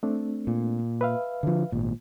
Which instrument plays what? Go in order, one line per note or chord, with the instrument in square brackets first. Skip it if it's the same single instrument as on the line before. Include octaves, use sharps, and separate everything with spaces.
[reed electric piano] A3 C4 D4
[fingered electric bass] A#2
[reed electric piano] B4 E5 F5
[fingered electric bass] D3 F3
G#1 A#2